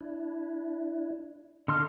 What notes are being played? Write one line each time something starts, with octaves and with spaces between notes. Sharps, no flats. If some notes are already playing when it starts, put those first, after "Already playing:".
D4 E4
D3 A4 D#5 F5 C6 F6